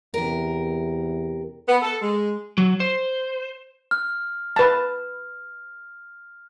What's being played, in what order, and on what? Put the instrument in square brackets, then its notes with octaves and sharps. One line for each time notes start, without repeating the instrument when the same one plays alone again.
[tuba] E2 [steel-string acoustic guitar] C3 A#4
[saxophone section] B3
A4
G#3
[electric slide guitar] F#3
C5
[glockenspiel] F6
[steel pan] B4 A5